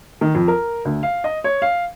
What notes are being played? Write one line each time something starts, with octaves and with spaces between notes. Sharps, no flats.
D#3
F2
A#4
D2
F5
D#5
C#5
F5